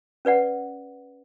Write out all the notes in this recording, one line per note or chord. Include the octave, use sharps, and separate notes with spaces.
C#4 B4 D5 F#5